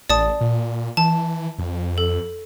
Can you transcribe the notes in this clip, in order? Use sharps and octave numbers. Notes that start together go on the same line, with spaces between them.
A1 D5 A5 D#6
A#2
E3 A5
F2
A4